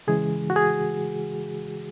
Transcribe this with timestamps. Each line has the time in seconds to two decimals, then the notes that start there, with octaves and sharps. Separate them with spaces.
0.07 C#3 E3 G#3 G#4
0.50 F#4
0.56 G#4